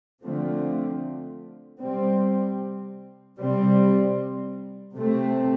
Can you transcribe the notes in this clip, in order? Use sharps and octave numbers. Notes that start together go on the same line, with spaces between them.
D3 F3 A3 C4
C3 G3 C4
C3 G3 C4
C3 A3 C4